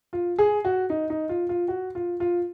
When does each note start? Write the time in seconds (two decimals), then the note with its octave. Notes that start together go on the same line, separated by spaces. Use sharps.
0.13 F4
0.39 G#4
0.65 F#4
0.90 D#4
1.10 D#4
1.29 F4
1.49 F4
1.68 F#4
1.95 F4
2.20 F4